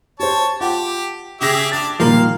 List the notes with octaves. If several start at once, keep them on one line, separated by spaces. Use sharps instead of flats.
G4 C5 C#5 A5
F4 G4 F#5 A5
C#3 G4 G#4 E5 A#6
D4 D5 A6 F7
A#2 D#3 F3 G3 A#3 F5